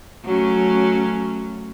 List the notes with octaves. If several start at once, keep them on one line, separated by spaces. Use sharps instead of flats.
F#3 A3 C#4